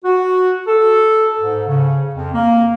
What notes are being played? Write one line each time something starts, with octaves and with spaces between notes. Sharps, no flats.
F#4
A4
G#2
C#3
F2
A#3